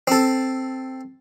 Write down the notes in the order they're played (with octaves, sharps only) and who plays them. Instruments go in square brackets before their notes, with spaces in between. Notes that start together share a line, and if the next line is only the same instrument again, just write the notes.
[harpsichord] C4 A4